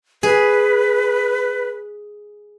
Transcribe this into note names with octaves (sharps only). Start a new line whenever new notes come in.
G#4 B4